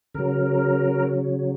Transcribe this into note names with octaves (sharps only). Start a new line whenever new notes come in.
C#3 F#3 A#4